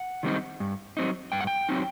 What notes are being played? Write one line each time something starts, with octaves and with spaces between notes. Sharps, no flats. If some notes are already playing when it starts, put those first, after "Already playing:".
Already playing: F#5
D#3 G3 C4 D#4
G2
F#3 C4 D#4
G2 G5
F#5
G5
F#3 C4 D#4